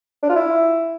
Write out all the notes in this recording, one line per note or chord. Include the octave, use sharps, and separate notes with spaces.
D4
F4
E4